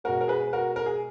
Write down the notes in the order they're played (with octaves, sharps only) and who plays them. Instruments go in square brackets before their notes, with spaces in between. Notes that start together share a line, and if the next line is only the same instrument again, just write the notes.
[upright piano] B2 G#3 F#4 A#4
A#4
G#4 B4
F#4 A#4
A#4
G#4